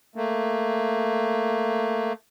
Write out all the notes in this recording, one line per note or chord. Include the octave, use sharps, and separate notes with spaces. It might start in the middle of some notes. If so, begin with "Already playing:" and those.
A3 A#3